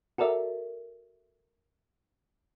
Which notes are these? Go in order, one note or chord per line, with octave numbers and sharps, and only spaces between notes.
F#4 A4 A#4 D5 E5